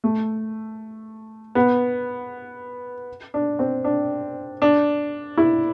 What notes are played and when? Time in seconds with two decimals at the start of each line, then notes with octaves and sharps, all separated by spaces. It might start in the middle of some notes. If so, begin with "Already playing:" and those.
0.04 A3
1.55 B3
3.34 D4
3.59 C4
3.84 D4
4.62 D4
5.38 E4